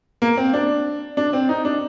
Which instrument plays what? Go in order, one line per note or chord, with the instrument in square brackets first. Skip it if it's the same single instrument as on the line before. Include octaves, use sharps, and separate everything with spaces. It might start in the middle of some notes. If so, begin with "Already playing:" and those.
[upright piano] A#3
C4
D4
D4
C4
D#4
D4